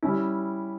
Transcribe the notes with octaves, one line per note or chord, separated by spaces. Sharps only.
G3 C#4 E4